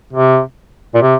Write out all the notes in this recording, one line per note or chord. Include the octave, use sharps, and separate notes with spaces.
C3
A#2
C3